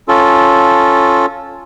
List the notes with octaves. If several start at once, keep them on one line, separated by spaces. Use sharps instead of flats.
C#4 F4 A4